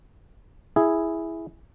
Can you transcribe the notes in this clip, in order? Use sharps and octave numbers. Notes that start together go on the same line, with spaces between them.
E4 G#4